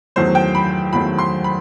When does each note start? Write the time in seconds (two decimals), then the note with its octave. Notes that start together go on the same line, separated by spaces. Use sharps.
0.16 E2 D#3 F#3 A3 C5
0.35 G5
0.55 B5
0.93 E2 D#3 F#3 A3 B5
1.19 C6
1.44 B5